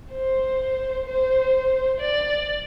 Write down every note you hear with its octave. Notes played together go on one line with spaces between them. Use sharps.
C5
C5
D5